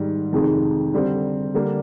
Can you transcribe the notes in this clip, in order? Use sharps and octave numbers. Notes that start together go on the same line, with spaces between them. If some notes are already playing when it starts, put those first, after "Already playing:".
Already playing: G#2 D#3 G3
F2 C3 D#3 G#3
D3 G3 C4
D3 G3 A#3 D4